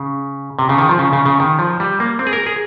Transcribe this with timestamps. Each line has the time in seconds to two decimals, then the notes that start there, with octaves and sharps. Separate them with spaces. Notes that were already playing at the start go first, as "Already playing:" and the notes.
Already playing: C#3
0.59 C3
0.69 C#3
0.78 D#3
0.89 F3
0.99 C#3
1.13 C#3
1.26 C#3
1.40 D#3
1.59 F3
1.80 G3
2.00 A#3
2.19 C4
2.27 G#4
2.33 A#4
2.46 G#4